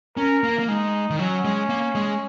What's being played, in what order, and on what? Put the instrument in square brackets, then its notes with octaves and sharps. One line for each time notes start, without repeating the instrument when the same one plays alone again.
[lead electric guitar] C#4 [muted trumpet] A#4
[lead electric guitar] A#3
A#3
[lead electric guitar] G#3 [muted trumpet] D#4
[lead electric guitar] D#3
[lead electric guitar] F#3 [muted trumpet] C#4
[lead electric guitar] G#3
A#3
G#3